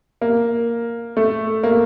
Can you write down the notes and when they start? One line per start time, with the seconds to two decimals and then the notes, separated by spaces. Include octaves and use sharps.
0.21 A#3
1.17 A3
1.63 A#3